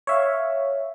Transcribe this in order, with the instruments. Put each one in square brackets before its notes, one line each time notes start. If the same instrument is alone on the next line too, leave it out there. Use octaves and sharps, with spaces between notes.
[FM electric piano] C#5 E5 F5